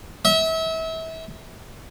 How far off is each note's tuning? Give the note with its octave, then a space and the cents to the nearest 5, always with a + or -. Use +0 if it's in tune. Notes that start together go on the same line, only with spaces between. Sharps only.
E5 -30